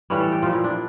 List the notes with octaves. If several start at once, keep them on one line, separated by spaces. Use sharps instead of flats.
A2 E3 G3 C#5
A4
G4
A#2 F3 F4
E4
D4